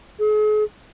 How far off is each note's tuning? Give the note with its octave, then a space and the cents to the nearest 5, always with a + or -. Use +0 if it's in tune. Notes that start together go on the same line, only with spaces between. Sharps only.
G#4 +40